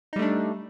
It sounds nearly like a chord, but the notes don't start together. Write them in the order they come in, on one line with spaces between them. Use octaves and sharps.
D#4 G3 A3 D4